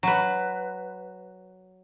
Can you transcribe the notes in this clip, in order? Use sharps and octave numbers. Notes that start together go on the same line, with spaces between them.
F#3 B4